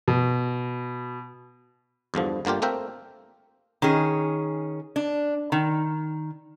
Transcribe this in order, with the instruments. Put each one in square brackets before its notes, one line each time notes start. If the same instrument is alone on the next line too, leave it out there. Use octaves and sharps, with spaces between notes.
[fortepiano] B2
[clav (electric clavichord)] E2 G2 D3 F3
G1 D3 A#3 F4 G4
A3 A#3 C4 A#4 E5 G5
[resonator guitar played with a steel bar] D#3 C#4 G#4
D4
D#3